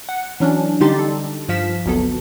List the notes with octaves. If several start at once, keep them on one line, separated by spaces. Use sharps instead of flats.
F#5
E3 F#3 C#4 D4
D3 G3 D#4 G4 C6 A6
A4
G2 F3 F5 B6 E7
G#1 D2 F#3 B3 A4